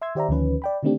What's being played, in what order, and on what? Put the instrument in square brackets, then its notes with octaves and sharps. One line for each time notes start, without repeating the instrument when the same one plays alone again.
[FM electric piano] E5 C6 E6 G#6
D#3 G4 C5 D5 E5 A#5
D2 D#3 F3 C#4 B4
D5 G5 B5
D3 D#3 A3 C4 D4 G4